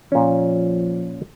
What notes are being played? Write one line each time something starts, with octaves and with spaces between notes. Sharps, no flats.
A#2 F3 C#4